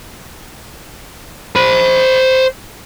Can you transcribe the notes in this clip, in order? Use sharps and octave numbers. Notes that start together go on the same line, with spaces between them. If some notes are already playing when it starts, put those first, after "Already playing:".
C5 B5